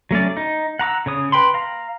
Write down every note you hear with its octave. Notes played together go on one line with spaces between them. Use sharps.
F#3 A3 C#4 D5
D#4
F#5 A#5 D6 E6
C#3 C#5 D#6
B4 G5 B5 C6
F5 A#5